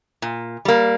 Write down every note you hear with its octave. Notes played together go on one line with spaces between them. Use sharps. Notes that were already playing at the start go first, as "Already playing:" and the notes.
A#2
G3 A#3